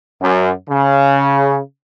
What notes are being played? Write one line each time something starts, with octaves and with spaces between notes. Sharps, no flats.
F#2
C#3